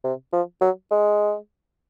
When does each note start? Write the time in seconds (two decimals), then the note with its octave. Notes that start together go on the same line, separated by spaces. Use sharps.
0.04 C3
0.33 F3
0.61 F#3
0.91 G#3